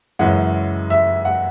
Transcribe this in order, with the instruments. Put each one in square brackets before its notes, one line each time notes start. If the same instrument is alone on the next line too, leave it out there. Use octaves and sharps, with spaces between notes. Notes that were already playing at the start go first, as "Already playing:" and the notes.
[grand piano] F#2 C#3 E3 G#3 [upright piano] F#5
[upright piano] E5
F#5